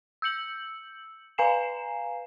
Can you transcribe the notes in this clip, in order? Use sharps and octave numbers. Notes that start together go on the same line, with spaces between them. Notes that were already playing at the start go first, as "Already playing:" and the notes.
E6 G6 C#7 F#7
B4 F5 G#5 A#5 C7 E7